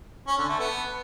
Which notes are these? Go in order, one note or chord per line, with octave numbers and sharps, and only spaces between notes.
C#4
D3
A3
B3